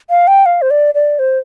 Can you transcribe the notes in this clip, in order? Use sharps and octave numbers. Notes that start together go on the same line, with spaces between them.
F5
G5
F5
C5
D5
D5
C5